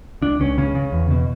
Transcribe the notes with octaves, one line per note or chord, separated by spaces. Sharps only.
C#2 D4
C#2 C#4
C#3 C#4
C#3
E2
B2